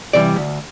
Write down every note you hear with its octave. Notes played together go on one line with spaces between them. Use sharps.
C3 E3 G3 D5
D2